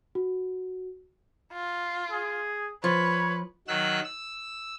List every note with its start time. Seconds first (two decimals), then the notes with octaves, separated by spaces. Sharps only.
0.15 F#4
1.53 F4
2.11 G#4
2.84 F3 B4 C#5
3.68 D#3 F#3 E6 F#6
4.04 E6